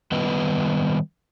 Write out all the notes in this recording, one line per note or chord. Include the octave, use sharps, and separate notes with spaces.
D#3 G3 B3 B4 D#5